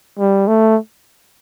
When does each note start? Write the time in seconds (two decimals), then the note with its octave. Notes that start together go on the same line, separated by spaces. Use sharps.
0.19 G3
0.48 A3